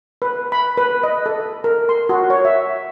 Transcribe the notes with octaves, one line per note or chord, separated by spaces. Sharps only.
B4
B5
B4
D#5
A4
A#4
C6
F#4
C#5
E5